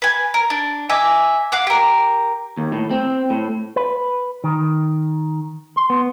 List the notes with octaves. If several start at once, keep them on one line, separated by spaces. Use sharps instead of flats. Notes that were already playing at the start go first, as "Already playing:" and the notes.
B4 G#5
A#4
D4
D#5 E5 G#5 D6
F5 F#5 D6 F#6
G4 A#4
D#2
A2
C4
A2
B4
D#3
C6
B3